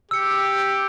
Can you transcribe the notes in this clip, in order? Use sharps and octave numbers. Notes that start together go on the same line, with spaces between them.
G4 E6 C#7